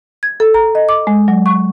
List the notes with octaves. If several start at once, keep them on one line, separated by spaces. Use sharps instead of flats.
G#6
A4
A#5
D#5
D6
G#3
F#3
C#6